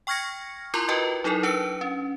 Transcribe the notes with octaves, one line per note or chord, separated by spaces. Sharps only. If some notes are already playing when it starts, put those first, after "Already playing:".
G5 C#6 F6 G#6 A#6 C#7
E4 F4 A#4 A#5 C6 D6
F4 F#4 A#4 B4 D#5 G5
F#3 D#4 E4 A4 A#4
D4 B4 E6 C#7
C#4